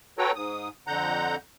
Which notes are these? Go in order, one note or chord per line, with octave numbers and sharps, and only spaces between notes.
F#4 A4 B4 C#5 G5 A#5
G#2 D#6
F2 D3 F#5 A#5 G6